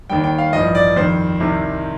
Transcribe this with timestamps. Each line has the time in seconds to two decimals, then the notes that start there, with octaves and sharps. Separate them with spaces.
0.10 D#2 D#3 G3 G5
0.24 G5
0.38 F5
0.53 A1 G2 F3 D#5
0.75 D5
0.96 F2 D#3 G3 C5
1.40 C2 C3 D#3